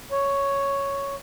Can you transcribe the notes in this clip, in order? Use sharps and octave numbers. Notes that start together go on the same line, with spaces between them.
C#5